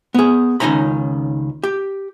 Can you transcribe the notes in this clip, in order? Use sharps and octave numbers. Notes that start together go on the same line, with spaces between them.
B3 G#4
C#2 D#3 C#4 D#4 A#5 B5
G4